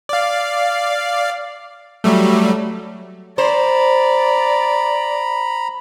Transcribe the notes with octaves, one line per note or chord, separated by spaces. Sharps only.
D5 F5
F#3 G3 A3
C5 D5 A#5 B5